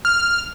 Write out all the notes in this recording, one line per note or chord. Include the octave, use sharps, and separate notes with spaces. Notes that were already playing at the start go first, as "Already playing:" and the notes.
F6